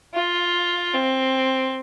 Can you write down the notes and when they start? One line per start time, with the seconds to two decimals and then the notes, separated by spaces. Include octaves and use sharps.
0.14 F4
0.94 C4